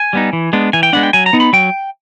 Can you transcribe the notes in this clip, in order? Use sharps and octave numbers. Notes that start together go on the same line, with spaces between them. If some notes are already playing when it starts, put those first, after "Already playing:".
Already playing: G#5
G3 B3 D#4
E3
G#3 B3 D4
E3 G#5
G5
G#3 B3 D4 F#5
G5
F#3 G#5
A#5
B3 D#4
B5
F#3 G5